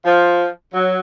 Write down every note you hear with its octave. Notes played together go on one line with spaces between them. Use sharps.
F3
F#3